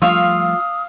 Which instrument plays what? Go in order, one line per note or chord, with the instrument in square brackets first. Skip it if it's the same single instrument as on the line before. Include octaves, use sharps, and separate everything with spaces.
[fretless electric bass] F3 G3 A3 [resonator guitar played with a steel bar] F4 [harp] F5 C#6 E6 [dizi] D#6